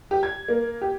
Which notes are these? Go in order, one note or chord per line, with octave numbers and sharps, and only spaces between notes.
G4
G#6
A#3
G4